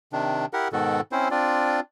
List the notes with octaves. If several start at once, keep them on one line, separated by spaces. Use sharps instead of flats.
C3 D#3 D4
E4 G4 A#4 F#5
G#2 B2 D#3 F#4 A4
C4 C#4 E4 C5
C4 D4 F4 D5